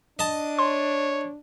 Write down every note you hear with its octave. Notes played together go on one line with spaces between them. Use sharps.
D4 D#5 A5
C#5 C6